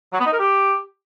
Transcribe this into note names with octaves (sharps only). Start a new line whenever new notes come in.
F#3
B3
D#4
A#4
G4